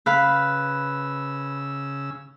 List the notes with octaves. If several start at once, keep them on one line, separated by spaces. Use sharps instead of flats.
C#3 B4 F5 B5 E6